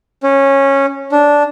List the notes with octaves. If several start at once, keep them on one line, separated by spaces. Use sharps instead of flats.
C#4
D4